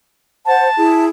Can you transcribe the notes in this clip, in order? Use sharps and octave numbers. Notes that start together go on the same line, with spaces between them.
C5 F#5 A5
E4 G#4